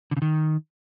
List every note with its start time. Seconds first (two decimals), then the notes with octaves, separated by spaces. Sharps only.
0.11 D3
0.17 C#3
0.22 D#3